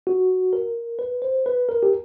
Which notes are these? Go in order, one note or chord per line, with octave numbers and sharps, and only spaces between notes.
F#4
A#4
B4
C5
B4
A#4
G4